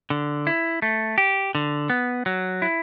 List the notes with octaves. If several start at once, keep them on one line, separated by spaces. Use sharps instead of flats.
D3
E4
A3
G4
D3
B3
F#3
E4